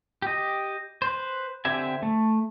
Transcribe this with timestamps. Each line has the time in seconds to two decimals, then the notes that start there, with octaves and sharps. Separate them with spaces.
0.22 G4 D#5
1.02 B4 C5
1.65 D3 C4 G4 E5 G#5
2.03 A3